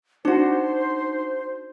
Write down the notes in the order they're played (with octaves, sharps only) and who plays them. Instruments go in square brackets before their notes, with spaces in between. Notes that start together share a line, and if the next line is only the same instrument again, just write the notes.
[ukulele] D4 F#4 [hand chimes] D#4 [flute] C5